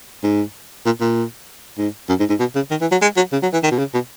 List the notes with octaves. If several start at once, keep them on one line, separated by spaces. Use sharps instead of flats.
G#2
A#2
A#2
G#2
F#2
G#2
G#2
B2
C#3
D#3
E3
F#3
G#3
F#3
C#3
F#3
E3
D#3
B2
C#3
B2